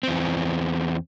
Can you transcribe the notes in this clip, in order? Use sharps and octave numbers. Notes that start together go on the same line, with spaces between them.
E2 C4